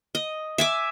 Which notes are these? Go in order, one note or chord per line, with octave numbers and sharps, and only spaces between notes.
D#5
E5 G#5 D6